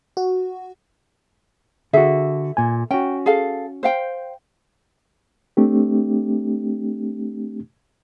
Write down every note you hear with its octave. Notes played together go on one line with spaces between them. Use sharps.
F#4
D3 F#4 G#4 A4 E5
A#2 G#5
C#4 F#4 G5
G#4 A4 F5
C5 F5 G5
A3 C4 D4 G4